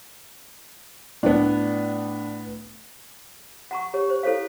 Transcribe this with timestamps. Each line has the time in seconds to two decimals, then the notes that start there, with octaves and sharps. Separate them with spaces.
1.23 A2 B3 D4
3.71 F#5 A#5 C#6
3.94 G4 C#5
4.09 C5
4.23 E4 A4 C5 C#5 F5